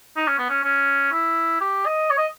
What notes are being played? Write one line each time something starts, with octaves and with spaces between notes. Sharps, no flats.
D#4
C#4
B3
C#4
C#4
E4
G4
D#5
C#5
D#5